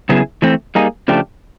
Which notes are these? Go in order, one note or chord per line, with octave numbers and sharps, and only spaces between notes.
C#3 F#3 B3 E4 G#4
E3 A3 C4
G3 A#3 D#4 G#4
C#3 F3 A3 D4 G4